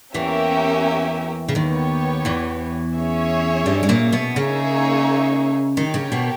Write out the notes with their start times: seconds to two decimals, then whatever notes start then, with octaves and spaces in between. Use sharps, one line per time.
0.14 E2 E3 A#3 C#4 G4 A#4 E5
1.48 C#3
1.55 D#2 D#3 B3 G4 C#5
2.25 E2 E3
2.95 C#4 G#4 C#5 E5
3.66 G2 G3
3.83 G#3
3.89 A#2 A#3
4.12 B2 B3
4.36 C#3 A#3 C#4 D#4 G#4 C#5 E5
5.76 D#3 D#4 G4 A#4 C#5 G5
5.94 C#3 C#4
6.12 B2 B3